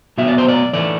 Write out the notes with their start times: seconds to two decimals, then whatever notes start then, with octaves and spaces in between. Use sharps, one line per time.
0.18 B2 F#3 B3 E5
0.28 D5
0.38 C5
0.48 D5
0.73 A2 E3 A3 D5